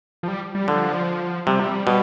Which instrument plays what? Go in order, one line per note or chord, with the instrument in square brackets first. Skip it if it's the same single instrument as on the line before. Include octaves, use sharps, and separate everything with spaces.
[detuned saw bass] F3
G3
G3
[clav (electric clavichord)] D3 [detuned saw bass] F3
[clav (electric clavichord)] C3 [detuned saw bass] G3
[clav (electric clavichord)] B2 [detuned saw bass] G3